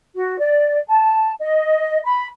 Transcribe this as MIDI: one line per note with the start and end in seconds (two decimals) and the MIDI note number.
0.14 0.36 66
0.38 0.78 74
0.88 1.32 81
1.40 1.99 75
2.03 2.25 83